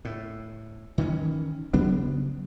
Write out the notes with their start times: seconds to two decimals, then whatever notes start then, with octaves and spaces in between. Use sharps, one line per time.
0.05 A2
0.98 D#3 E3 C4 C#4
1.73 C#3 F#3 B3 D4